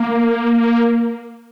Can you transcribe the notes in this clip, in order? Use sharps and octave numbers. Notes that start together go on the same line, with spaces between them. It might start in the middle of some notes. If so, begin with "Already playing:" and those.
Already playing: A#3